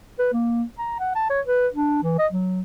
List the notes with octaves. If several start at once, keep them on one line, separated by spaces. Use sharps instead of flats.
B4
A#3
A#5
F#5
A5
C#5
B4
D4
E3
D#5
F#3